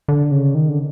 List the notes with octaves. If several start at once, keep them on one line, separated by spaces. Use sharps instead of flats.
D3
C#3
D#3
D3